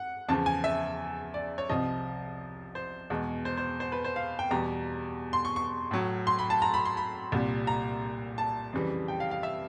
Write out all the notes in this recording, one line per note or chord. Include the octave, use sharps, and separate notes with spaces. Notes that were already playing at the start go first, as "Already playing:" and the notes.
Already playing: F#5
E2 C#3 F3 A5
G#5
E5
D5
C#5
C2 C3 F3 D#5
C5
E2 B2 G#3
C5
C5
C5
B4
C5
F5
G5
E2 B2 G3 A#5
C6
C#6
C#6
A2 F#3
C6
B5
A5
A#5
B5
C6
B5
C2 A#2 G3
A#5
A5
F2 C#3 E3 G3
G5
F5
F5
E5